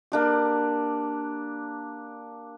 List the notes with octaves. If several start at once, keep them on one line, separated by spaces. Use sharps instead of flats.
A#3 D4 G4